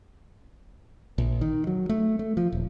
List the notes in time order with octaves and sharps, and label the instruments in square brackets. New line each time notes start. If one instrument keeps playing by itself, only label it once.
[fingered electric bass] A#1
D#3
F#3
A3
A3
F3
D#1